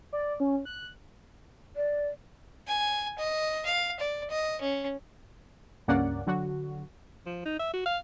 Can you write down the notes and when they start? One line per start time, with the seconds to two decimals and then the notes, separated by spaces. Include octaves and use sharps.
0.13 D5
0.40 C#4
0.65 F#6
1.76 D5
2.68 G#5
3.18 D#5
3.66 F5
4.00 D5
4.30 D#5
4.61 C#4
5.88 C#2 G2 A#3 C#4 D5 F#5
6.27 D3 F#3 F#4
7.26 F3
7.46 D#4
7.59 E5
7.74 F#4
7.86 F5